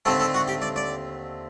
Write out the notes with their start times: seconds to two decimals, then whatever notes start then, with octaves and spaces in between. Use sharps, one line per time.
0.05 D#2 D3 A3 C4 A4
0.20 A4
0.34 F#4
0.48 G4
0.62 D5
0.76 D5